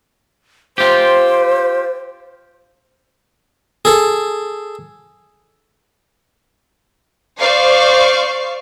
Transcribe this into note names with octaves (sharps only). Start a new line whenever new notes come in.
F4 G4 C5
G#4 A4
C5 D5 F5 C#6